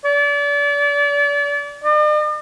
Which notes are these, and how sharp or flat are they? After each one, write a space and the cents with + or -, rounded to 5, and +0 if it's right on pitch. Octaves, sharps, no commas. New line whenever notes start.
D5 -35
D5 +45